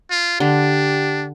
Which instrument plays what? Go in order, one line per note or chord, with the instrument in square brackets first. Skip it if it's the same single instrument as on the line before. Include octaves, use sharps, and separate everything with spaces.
[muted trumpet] F4
[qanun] D3 [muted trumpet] D4 [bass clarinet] G4